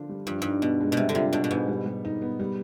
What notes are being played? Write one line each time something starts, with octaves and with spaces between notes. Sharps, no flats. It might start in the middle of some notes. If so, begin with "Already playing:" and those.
Already playing: D3 F3 D4 F4
G3
G2 F3
G2 D#4
B2 B3
G#3
B2
C3 G3
D3
C3 F4
B2 D4
B2
G#2 B3
G3
G3
D#4
B3
G3